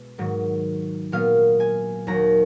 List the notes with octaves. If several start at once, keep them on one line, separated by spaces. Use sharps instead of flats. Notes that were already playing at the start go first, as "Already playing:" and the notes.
Already playing: B2 G#3
G#2 D#3 F#3
A#2 F#3 B3 F5
G#5
D#2 D#3 F#3 A#5